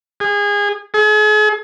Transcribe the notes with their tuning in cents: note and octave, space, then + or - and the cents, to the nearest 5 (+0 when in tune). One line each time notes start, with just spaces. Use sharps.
G#4 -25
G#4 +40